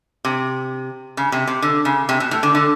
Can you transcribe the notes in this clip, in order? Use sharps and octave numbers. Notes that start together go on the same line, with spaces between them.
C3
C#3
C3
C3
D3
C#3
C3
B2
A2
D3
D3